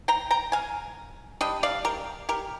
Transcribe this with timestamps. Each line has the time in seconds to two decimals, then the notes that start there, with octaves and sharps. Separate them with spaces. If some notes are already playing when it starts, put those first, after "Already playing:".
0.08 G5 A#5
0.31 G5 A#5
0.52 F5 G#5
1.41 G3 D4 D#5 G5
1.63 D5 F5
1.85 G4 A#4
2.29 G4 A#4